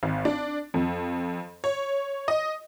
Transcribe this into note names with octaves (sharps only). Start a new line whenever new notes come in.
G#1
D4
F2
C#5
D#5